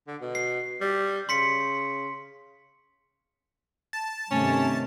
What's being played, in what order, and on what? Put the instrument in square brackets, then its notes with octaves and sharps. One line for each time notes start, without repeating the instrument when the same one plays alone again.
[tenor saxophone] D3
B2
[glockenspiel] C7
[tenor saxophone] G3
[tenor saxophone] C#3 [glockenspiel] C6 B6 C#7
[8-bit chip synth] A5
[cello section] G2 C3 D#3 [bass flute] A3 [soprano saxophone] C#4